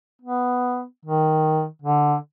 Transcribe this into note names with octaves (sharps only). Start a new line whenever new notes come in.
B3
D#3
D3